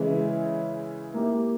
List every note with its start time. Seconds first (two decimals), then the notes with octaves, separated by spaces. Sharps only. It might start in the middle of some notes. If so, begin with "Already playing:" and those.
Already playing: C#3 E3 G#3 C#4 E4
1.14 A#3 E4 G4